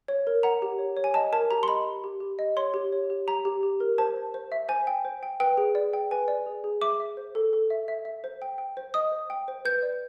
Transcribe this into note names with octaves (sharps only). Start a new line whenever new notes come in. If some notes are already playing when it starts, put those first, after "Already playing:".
C#5
A#4
F#5 A#5
G4
C#5
C#5
G#5
D#5 A5
A#4 A5
G4 A#5
C6
D#5 B5
G4
G4
G4
D#5
C#5 C6
G4
C#5
G4
G4 A#5
G4
G4
A#4
C5 A5
C5
C5
E5
C5 G#5
G5
C5
G5
B4 G5
G#4
D5
G5
B4 G#5
D5
G#4
G#4
E5 D6
E5
C5
A4
A4
E5
E5
E5
C5
G5
G5
C5
D#5 D#6
C5
G5
C5
B4 G6
D5